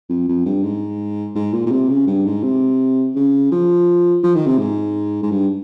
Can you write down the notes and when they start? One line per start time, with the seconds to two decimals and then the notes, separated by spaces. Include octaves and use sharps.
0.09 F2
0.28 F2
0.46 G2
0.63 G#2
1.35 G#2
1.53 A#2
1.66 A#2
1.72 C3
1.89 C#3
2.07 G2
2.25 G#2
2.43 C3
3.15 C#3
3.52 F3
4.23 F3
4.35 D#3
4.46 C3
4.58 G#2
5.23 G#2
5.30 G2